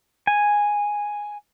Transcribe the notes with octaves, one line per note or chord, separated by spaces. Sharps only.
G#5